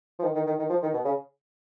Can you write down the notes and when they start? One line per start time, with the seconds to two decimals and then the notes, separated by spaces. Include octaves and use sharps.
0.19 F3
0.23 D#3
0.35 D#3
0.47 D#3
0.59 D#3
0.70 F3
0.82 D#3
0.93 B2
1.05 C#3